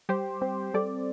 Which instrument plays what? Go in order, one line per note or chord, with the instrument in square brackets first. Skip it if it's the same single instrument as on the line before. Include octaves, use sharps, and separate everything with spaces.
[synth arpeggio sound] G3 G4 C5
C4
G3 A4 D5